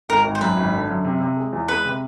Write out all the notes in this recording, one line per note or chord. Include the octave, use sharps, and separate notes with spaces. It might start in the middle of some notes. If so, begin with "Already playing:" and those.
G#1 A#4
G#1
C5
F#2 B4
G#1
D3
F#2
C3
C3
G#3
E2
G#3 B4
C3